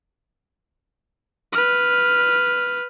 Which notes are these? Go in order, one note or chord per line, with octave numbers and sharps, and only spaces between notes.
B4 F6